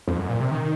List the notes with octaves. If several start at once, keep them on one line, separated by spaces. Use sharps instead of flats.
F2
F#2
A#2
C3
D#3